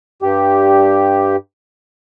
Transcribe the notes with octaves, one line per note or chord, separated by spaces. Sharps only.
G2 G4